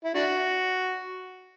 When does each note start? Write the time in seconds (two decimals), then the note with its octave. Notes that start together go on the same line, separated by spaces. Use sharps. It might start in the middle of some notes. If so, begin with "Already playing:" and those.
0.05 E4
0.15 D4 F#4